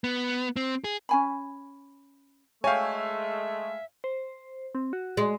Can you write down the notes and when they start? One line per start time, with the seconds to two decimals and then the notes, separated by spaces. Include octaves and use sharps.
0.04 B3
0.56 C4
0.84 G#4
1.09 C#4 G#5 B5
2.64 G#3 A3 C#5 E5 F5 G5 G#5
4.04 C5
4.75 C4
4.93 F#4
5.17 G#3